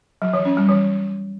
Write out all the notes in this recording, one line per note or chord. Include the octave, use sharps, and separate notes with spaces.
F#3
E3
C#4
G3
E3